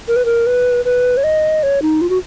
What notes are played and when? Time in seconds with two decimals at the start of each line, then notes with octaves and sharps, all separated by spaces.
0.08 A#4
0.16 B4
0.25 A#4
0.47 B4
0.85 B4
1.17 C#5
1.24 D#5
1.63 C#5
1.82 D#4
2.01 F4
2.10 F#4